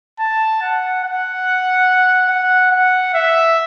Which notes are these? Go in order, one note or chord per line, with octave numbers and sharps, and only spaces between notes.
A5
F#5
F#5
F#5
F#5
E5